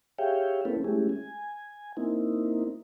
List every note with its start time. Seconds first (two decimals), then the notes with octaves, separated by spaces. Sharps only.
0.19 G4 G#4 C#5 E5 F5 G5
0.65 A#3 C4 C#4 E4 A4 B4
0.84 G#3 A3 C#4 E4 G4 G#4
1.09 G#5
1.97 A#3 C4 D#4 E4